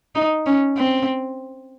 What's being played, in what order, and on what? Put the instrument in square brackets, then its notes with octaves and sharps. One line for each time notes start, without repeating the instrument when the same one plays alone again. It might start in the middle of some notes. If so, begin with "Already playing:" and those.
[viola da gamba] D#4
C#4
C4